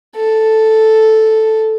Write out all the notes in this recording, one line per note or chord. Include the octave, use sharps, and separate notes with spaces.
A4